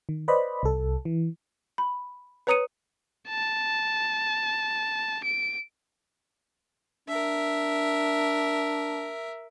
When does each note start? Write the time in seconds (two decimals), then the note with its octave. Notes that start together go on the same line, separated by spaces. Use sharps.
0.09 D#3
0.28 B4 C5 D5 D#5 B5
0.63 C2 A4
1.05 E3
1.78 B5
2.47 B4 C#5 A#5 D#6 C#7 D#7
3.29 A5
5.24 D7
7.08 D4 A#4 E5